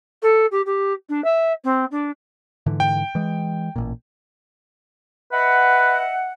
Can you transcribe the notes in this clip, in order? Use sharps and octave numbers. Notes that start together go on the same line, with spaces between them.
A4
G4
G4
D4
E5
C4
D4
G#2 D3 E3
G5
E3 G#3
A1 A#2
B4 D#5 E5 F#5